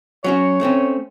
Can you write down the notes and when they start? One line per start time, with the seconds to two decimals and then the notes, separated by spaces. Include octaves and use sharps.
0.24 F#3 C#4 F#4 C#5
0.61 A3 C4 C#4